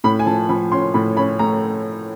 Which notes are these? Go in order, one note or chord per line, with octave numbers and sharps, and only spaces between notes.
A2 B5
G#5
F3 A5
F3 B5
C#4 C6
A2 B5
C#4 B5
A3 A#5